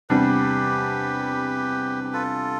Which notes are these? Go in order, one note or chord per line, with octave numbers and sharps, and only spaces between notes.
E2 C3 G3 D4 G4 B4
G4
F4 A4